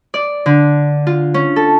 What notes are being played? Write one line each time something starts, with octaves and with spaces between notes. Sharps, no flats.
D5
D3
F4
C#4
A4